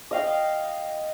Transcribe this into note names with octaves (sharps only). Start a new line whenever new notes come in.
D#5 F5 G5